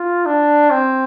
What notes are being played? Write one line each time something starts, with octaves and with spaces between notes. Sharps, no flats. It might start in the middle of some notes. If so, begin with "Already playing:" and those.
Already playing: F4
D4
C4